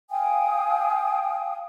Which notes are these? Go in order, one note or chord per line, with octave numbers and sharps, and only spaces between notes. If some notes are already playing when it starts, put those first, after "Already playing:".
F5 G5 G#5 D#6